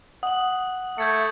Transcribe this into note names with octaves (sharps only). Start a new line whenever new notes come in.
F#5 D#6 F#7
A3 G6 G#6 C#7